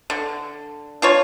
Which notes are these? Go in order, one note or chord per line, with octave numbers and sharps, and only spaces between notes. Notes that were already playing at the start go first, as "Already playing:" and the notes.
D3
D4 F4 C#5